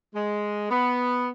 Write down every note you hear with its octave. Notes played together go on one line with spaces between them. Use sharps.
G#3
B3